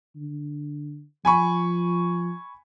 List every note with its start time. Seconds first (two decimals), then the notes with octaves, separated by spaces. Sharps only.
0.16 D3
1.25 F3 G#5 B5 C#6